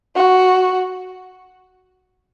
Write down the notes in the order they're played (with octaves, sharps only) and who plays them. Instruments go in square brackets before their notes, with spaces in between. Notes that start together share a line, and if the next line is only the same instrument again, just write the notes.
[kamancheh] F#4